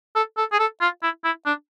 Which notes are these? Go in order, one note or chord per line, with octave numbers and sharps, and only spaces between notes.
A4
A4
G#4
A4
F4
E4
E4
D4